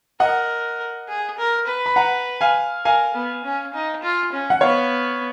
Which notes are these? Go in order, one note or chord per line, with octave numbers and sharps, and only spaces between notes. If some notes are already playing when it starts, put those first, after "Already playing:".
A#4 D#5 F#5
G#4
A#4
B4
B5
F#5 A#5
F5 G#5
A#4 F5 G#5
B3
C#4
D#4
F4
C#4
F#5
B3 C#5 F5